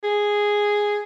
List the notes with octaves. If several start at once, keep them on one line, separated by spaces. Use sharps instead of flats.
G#4